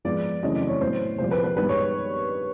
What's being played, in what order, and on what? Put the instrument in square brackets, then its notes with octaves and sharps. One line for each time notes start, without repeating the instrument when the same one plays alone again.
[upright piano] G#2 F3 G#3 B3 D5
F#2 C#3 E3 A3 C4 D#5
D5
C#5
A2 F#3 B3 C5
C2 A#2 F3 C5
B4
B4
G2 D#3 G#3 B3 B4
C#5